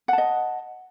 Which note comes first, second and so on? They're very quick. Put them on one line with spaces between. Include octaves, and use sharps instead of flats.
F#5 A5 D#5